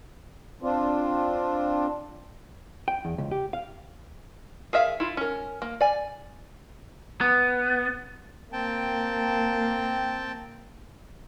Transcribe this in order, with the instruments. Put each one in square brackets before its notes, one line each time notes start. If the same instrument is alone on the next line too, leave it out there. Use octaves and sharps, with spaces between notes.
[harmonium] C4 D4 F4
[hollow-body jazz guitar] G5
E2
C#2
G4
F5
[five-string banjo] G#4 A#4 E5 F5
E4 F4
C#4 A#4
A#3
D5 G#5
[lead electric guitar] B3
[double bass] A#3 [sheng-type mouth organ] C4 G5 A5